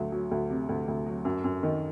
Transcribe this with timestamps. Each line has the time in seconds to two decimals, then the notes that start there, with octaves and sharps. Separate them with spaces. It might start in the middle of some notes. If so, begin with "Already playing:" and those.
Already playing: D2 F#3
0.12 F#3
0.31 D2
0.50 C3
0.69 D2
0.88 D2
1.06 F#3
1.25 F#2
1.44 F#2
1.63 D#3